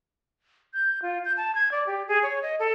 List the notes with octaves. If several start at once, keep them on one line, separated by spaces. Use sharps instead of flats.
G6
F4
G6
A5
G#6
D5
G4
G#4
C#5
D#5
A4